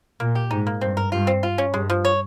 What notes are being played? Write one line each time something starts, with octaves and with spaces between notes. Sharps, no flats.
A#2 A#3
G4
G#2 D#4
A#3
G2 C4
A#4
G2 F4
C4
F4
C#4
G2 G#3
F3
C#5